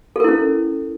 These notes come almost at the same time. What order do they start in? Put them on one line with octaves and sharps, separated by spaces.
A4 A#4 E4 C#4